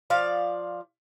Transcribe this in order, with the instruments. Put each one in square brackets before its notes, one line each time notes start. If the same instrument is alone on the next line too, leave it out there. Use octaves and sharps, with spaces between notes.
[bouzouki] F3 D5 F5